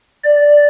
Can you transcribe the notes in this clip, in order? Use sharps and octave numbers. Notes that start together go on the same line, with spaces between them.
D5